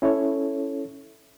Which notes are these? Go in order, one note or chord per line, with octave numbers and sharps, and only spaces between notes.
C#4 E4 A4 C#5